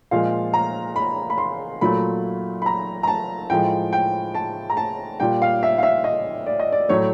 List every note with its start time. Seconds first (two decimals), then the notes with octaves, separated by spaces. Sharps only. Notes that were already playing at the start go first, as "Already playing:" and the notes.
0.11 A#2 F3 G#3 F5
0.54 A#5
0.96 B5
1.30 B5
1.38 C6
1.81 A#2 F#3 A3 B5
2.62 B5
2.66 A#5
3.03 A#5
3.07 A5
3.50 A2 F3 G#3 G5
3.93 G5
4.35 A5
4.70 A#5
4.77 A5
5.20 A#2 G3 G5
5.42 F5
5.63 E5
5.78 F5
5.83 E5
6.04 D#5
6.46 D5
6.60 D#5
6.72 D5
6.89 A2 F#3 A3 C#5